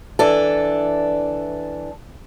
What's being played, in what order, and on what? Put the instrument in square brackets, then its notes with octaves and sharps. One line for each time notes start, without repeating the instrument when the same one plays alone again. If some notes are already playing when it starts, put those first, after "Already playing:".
[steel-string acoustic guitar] E3 D4 A4